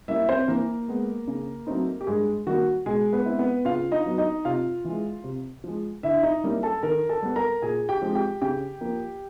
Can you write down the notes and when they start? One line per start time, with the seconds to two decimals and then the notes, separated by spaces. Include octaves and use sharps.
0.08 G3 A#3 C#4 E4 E5
0.29 C4 C5
0.48 E3 A#3 A#4
0.88 G#3 B3
1.28 C#3
1.67 F#3 A3 C4 D#4
2.01 G4
2.07 G2 G#3 G#4
2.46 D#3 G3 A#3 F#4
2.86 B2 G#3 G#4
3.13 B3 B4
3.25 G#3 C4 E4
3.39 B3 B4
3.65 C#3 F4 F5
3.92 D#4 D#5
4.06 F#3 B3
4.18 D#4 D#5
4.45 C3 F4 F5
4.85 E3 G#3
5.24 C3
5.64 F3 G#3
6.03 D3 E4 E5
6.23 D#4 D#5
6.44 G3 A#3 C#4 E4
6.63 A4 A5
6.83 D#3 A#4 A#5
7.09 A4 A5
7.22 G3 B3
7.36 A#4 A#5
7.62 A#2 G#4 G#5
7.89 G4 G5
8.02 F3 G#3 C4
8.15 G4 G5
8.41 C#3 G4 G5
8.81 F3 A#3